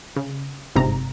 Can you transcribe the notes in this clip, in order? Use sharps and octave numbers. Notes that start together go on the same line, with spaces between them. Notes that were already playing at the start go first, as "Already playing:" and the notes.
C#3
G1 G#2 C3 A#5